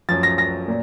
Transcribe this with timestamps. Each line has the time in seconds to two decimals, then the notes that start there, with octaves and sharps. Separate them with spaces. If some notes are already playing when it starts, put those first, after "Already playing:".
0.09 F#2 F3 A6
0.23 A#6
0.38 A#6
0.68 A#2